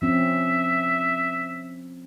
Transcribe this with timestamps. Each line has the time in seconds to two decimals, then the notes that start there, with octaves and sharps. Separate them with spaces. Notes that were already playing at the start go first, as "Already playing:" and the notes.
0.02 F3 C4 C#4 E5